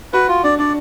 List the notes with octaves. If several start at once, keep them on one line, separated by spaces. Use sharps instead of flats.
F#4 B4
F4
D4 D5
D4 D5